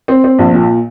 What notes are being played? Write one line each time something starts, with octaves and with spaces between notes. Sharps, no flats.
C4
C4
A#1
A#2